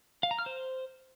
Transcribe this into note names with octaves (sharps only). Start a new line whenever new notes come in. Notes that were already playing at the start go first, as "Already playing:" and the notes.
F5
A#5
F6
C5